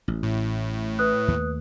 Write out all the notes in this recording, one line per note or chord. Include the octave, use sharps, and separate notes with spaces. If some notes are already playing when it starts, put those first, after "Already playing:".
A1
A2
B4 D#6 F#6
D#2 A3